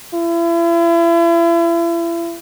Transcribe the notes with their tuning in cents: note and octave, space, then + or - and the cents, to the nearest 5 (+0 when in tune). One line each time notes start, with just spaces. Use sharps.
E4 +40